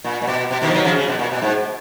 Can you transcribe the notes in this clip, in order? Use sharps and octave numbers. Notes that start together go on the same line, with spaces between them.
A#2
A#2
B2
B2
B2 D#3
F3
D#3 F#3
C#3 F3
C#3
B2
A#2
B2
G#2